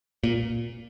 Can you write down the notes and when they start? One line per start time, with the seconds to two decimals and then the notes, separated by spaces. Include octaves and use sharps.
0.24 A#2